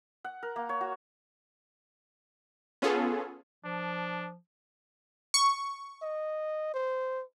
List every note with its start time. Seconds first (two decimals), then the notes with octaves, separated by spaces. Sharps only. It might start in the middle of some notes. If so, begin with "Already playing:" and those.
0.24 F#5
0.43 A#4
0.56 A#3
0.69 C#5
0.81 F#4
2.82 B3 C#4 F4 G#4 A4
3.65 F3 D4
5.34 C#6
6.02 D#5
6.74 C5